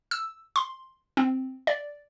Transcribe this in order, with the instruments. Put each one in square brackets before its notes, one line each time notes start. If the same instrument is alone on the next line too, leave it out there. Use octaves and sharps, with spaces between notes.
[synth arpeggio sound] E6
C6
C4
D5